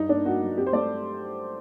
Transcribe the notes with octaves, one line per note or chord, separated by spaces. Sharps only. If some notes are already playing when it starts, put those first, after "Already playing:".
Already playing: G2 D#4
A#3 D4
A#3 F#4
F#3
C4 G4
C5
A3 D5